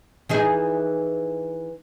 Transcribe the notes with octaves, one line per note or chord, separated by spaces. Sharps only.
E3 D#4 G#4